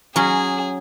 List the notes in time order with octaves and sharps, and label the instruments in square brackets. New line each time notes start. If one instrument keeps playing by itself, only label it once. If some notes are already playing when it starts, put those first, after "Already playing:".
[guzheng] F#3 C#4 [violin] G#4